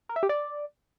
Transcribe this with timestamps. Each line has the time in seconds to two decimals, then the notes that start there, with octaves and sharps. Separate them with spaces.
0.09 A#4
0.16 E5
0.23 G4
0.29 D5